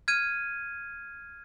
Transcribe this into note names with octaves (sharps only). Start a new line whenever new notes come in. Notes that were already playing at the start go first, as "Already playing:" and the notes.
F6 G#6 D#7